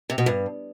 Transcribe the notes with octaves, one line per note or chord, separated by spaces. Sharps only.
C3
B2
G2